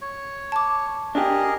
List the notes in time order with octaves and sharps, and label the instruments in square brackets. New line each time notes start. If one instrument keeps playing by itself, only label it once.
[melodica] C#5
[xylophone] A5 D6
[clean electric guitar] D4 G4 [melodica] G#4 A#4 D#5